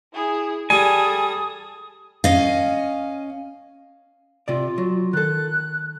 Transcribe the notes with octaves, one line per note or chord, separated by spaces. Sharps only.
E4 G#4
G3 G#4 A4 G#5 D#6
C#4 D#5 F5
C3 F4 D5
F#3
D#3 A4 F#6